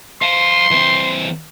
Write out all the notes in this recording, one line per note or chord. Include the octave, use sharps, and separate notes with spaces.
F5 A5 C6
E3 C4